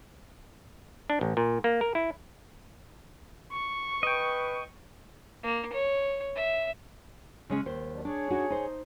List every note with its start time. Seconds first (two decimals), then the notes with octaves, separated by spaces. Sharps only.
1.10 D4
1.21 A1
1.37 A#2
1.64 A#3
1.81 A#4
1.95 E4
3.52 C#6
4.03 B4 D#5 G5
5.43 A#3
5.73 C#5
6.35 E5
7.50 C#3 G#3 C#4
7.66 D#2 C5
7.93 D#3 F#3 D4
8.05 D4 G#4 C#5
8.30 D4 D#4 F#4
8.50 D#4 C5